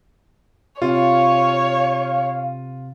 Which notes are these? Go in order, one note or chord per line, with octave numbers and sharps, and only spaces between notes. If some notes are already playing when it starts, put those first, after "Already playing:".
C3 F4 C#5 F5